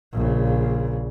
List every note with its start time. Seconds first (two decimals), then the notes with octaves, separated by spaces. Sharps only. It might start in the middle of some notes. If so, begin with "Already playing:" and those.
0.13 A#1 C#3